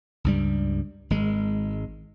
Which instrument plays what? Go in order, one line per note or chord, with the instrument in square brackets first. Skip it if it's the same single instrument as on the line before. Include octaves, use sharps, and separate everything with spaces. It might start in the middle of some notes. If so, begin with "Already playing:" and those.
[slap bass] C#2 G2 G3
G#1 G#3